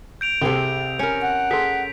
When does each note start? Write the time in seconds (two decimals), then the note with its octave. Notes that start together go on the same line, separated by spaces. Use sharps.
0.21 G6 D7 F7
0.42 C2 C3 G#4 A4 G5
0.99 C#4 A#4
1.22 F#5
1.51 G#4 A4 C6 B6